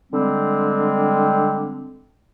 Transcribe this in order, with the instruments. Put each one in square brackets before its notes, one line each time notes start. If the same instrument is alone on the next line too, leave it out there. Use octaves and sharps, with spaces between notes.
[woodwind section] D3 G3 G#3 C4